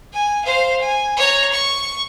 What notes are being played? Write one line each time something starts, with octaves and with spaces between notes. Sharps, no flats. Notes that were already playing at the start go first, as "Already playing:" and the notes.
G#5
C5 F5
G#5
C#5 A#5
C#6